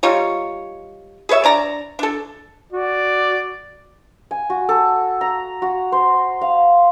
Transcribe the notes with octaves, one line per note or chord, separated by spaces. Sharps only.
G3 D#4 F4 C#5
G#4 B4 C#5 E5
D4 D5 A#5
D4 A4
F#4 D5
G#5
F#4
A4
A#5
F#4
C5
F5